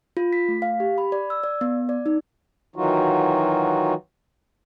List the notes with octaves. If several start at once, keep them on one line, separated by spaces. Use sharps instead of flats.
F4
B6
A3
F5
G4
B5
D5
E6
D5
B3
D5
D#4
D#3 E3 F#3 D#4 F4 F#4